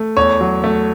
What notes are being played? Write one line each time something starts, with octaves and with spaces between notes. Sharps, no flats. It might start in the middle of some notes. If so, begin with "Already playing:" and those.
Already playing: A3
E2 C#5
F#3
A3